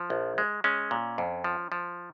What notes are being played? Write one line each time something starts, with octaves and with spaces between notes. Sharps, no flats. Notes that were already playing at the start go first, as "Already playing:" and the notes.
Already playing: F3
A#1
G#3
G#3 C#4
A#2
F2
F3
F3